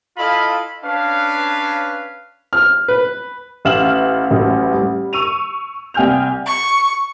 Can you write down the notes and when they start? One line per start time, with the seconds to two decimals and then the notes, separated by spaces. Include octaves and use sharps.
0.17 E4 F4 A4 D#5 F5 B5
0.84 C#4 D4 B4 C#5 F5
2.53 F6
2.88 B4
3.65 A1 E5 F5 F6 E7 F#7
4.30 A1 A2 F#3
4.74 G3
5.13 C#6 E6 D#7 F7
5.94 C2 G5 G#5 F6 G6 F7
6.46 C#6